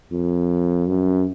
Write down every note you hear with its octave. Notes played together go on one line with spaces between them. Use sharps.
F2
F#2